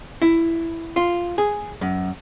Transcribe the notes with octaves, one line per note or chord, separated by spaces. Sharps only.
E4
F4
G#4
F#2